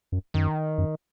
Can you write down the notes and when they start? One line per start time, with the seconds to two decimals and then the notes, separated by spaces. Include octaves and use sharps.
0.12 F#2
0.34 F#2 D#3
0.78 F#2